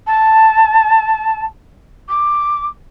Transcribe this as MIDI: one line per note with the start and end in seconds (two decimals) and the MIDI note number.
0.07 1.43 81
2.08 2.66 86